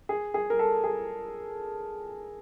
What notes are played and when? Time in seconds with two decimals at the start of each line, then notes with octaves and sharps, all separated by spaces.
0.09 G#4
0.34 G#4
0.50 A#4
0.59 A4
0.84 G#4